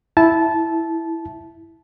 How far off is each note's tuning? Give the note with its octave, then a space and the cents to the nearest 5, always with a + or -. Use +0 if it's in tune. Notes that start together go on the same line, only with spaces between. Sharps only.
E4 +0 A5 -15